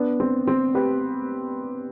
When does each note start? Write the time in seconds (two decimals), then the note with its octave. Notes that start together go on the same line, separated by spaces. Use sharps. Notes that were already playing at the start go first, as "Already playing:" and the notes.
Already playing: B3 D4
0.20 C4
0.47 C4
0.75 G4 B4